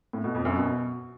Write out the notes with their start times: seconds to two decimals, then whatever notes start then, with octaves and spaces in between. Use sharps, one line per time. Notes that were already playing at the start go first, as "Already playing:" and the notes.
0.13 A2
0.24 B2
0.35 F2
0.45 F#2
0.56 B2